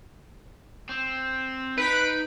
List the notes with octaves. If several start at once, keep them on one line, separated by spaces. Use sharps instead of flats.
C4
D#4 B4 B6 D7